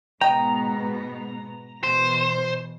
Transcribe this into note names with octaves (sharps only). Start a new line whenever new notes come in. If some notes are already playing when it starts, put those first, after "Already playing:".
G#2 B2 B3 D#5 G5 A#5
B2 E3 C5